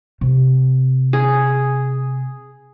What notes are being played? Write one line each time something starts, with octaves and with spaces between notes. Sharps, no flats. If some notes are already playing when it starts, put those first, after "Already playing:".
C3
G#4